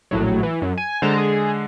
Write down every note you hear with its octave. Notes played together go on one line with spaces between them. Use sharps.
A#1 A2 F#3
E3
F#2
G#5
D3 G#3 C5 A5 A#5
G#4